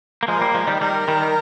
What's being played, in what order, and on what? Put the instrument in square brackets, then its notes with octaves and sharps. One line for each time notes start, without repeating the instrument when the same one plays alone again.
[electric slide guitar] A#3
[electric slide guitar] F3 G#3 [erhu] A#4
[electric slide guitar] G3 A#3
F3 G#3
D#3 G3
[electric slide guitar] D#3 G3 [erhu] A#4
[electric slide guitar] D#3 G3